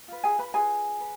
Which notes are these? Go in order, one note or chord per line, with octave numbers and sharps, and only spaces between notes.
F4 B4
G#4 G#5
B4 B5
F4 G#4 B4 G#5
B4